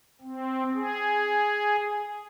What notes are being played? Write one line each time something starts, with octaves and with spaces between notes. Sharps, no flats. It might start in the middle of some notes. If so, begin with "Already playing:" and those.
C4
G#4